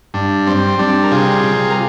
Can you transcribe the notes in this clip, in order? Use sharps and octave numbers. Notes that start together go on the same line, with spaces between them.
G2 D4
G3 C4
G3 D4
A#4
C3 F4 G#4
C3
A#4